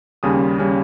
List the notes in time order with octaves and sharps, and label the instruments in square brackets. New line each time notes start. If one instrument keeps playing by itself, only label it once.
[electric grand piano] D#2 C#3 G3 C#4 D#6
C#3 G3 C#4